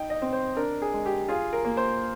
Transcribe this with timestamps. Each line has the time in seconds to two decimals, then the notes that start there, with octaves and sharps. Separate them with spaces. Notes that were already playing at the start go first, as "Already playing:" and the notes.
Already playing: D#4 G5
0.10 D#5
0.22 C4
0.33 C5
0.57 D4 A#4
0.82 G#4
0.94 G#3
1.06 G4
1.28 F4 G#4
1.53 A#4
1.65 A#3
1.77 C5